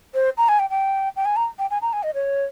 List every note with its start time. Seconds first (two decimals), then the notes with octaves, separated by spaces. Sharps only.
0.14 C5
0.37 A#5
0.49 G#5
0.59 G5
0.70 G5
1.16 G5
1.25 G#5
1.36 A#5
1.59 G5
1.70 G#5
1.82 A#5
1.93 G#5
2.03 D#5
2.14 C#5